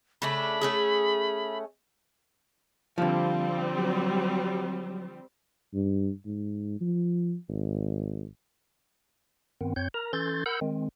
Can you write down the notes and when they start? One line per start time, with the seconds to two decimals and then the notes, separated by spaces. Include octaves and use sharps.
0.22 C#3 A3 D4 B5
0.61 A3 C#4 G#4
2.98 D3 F3 G3 C4 F5
3.75 F#3
5.74 G2
6.25 G#2
6.80 F3
7.49 G#1
9.61 G2 D#3 B3 C4
9.76 F#2 C4 C#5 G6
9.94 A#4 A#5
10.13 E3 C#4 A4 C6 G6 A6
10.46 A#4 F#5 B5 E6 G6
10.61 D#3 G#3 C4